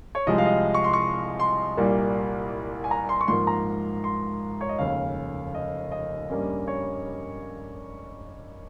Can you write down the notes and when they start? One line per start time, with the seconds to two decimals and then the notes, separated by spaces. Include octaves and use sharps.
0.15 C#5
0.26 C2 C3 F3 G#3 D#5
0.38 F5
0.46 D#5
0.74 C#6
0.84 C6
0.93 C#6
1.40 C6
1.77 C2 A#2 G3 A#3
2.84 G#5
2.91 A#5
3.09 C6
3.21 C#6
3.28 G#2 F3 A#3 C6
3.47 A#5
4.04 C6
4.61 C#5
4.69 D#5
4.79 F1 D#2 C#3 F5
5.55 D#5
5.92 D#5
6.30 G2 G3 A#3 C#4
6.68 C#5